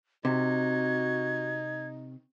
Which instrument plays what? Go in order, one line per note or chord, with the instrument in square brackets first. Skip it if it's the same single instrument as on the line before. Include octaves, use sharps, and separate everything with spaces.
[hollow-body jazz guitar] C3 [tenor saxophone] D#4 [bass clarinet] F#4 [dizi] G#6